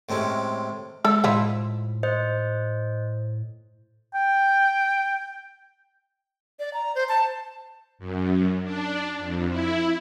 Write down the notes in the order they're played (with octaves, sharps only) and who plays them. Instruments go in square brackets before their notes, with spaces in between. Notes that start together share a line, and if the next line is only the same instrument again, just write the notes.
[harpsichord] A2 C3 G#3 C#4
[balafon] G#3 [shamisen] A4
[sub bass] A2 [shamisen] F3 D#4 E4
[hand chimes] C5 D#5 G6
[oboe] G5
[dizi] D5
A#5
C5
A5
[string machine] F#2
D4
F2
E4